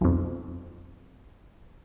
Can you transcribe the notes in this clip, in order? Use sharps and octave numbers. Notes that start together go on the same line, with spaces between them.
B1 F2